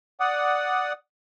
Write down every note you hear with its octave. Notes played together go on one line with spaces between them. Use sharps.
D5 F#5 D#6